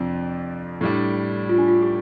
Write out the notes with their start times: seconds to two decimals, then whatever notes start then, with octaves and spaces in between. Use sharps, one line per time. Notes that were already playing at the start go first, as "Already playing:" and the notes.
Already playing: F2 C3 F3 D4
0.81 A2 G3 D4
1.49 F4
1.58 D4
1.68 F4
1.82 G4